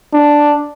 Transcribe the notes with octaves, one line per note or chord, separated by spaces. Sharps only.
D4